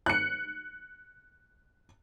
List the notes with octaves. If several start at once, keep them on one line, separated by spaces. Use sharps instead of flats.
F#6 C#7